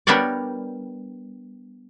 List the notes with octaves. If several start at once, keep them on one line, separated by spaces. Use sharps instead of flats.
G3 B3 D4 A#4 C#5 D5